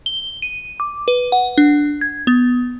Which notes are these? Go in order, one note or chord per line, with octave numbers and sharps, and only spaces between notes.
G7
D#7
D6
B4
F#5
D4
G#6
B3